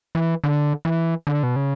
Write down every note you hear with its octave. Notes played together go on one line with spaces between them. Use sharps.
E3
D3
E3
D3
B2
C#3